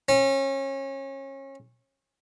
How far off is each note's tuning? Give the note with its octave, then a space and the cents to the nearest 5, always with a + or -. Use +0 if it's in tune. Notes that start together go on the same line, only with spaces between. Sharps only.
C#4 -30